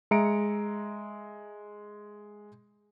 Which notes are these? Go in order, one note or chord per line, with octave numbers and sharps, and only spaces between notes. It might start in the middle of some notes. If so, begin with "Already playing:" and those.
G#3 E5 A#5 C#7 D7